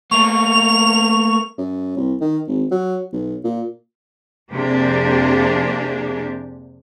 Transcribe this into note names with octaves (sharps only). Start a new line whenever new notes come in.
A3 A#3 C#6 F7
F#2
C2
D#3
G#1
F#3
B1
A#2
F2 C3 A#3 D4 G4 G#4